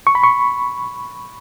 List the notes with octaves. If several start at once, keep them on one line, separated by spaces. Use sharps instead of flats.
C#6
B5
C#6